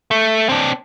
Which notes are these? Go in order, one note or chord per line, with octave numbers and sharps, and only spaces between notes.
A3
C4 D4